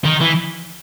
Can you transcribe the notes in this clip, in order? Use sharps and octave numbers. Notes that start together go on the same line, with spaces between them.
D#3
E3